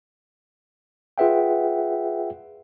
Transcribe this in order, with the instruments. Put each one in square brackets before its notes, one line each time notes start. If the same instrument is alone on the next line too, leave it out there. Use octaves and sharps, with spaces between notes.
[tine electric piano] F4 G#4 B4 E5 F#5 G5